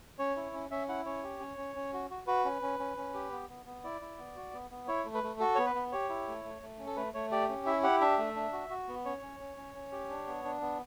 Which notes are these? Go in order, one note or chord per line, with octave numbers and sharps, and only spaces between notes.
C#4 C#5
E4
C#4
C#4 E5
E4 F#5
C#4 C#5
G4
C#4
C#4
C#4
F#4
F#4
F#4 B4
C#4
C#4
C#4
C#4
G4
B3
B3
B3
E4 D5
E4
B3
F#4
B3
B3
E4 C#5
A3
B4
A3
F#4 A4
B3 C#5
B4
B3
G4 C#5
E4
A3
A3
A3
C#4
A4
A3 B4
A3 C#5
G4 D5
C#4
E4 E5
G4 F#5
D4 E5
A3
D4
F#4
F#4
B3
C#4 C#5
C#4
C#4
C#4
C#4
G4
D4
B3
D4
B3